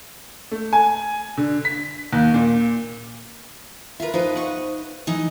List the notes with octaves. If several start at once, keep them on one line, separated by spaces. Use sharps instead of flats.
A3
G#5
D3
B6
D#2
A#2
F4 A#4 B4 E5
F3 D#4 B4
F#5 C#6
E3 D#4